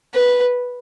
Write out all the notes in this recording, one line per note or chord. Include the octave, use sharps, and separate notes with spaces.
B4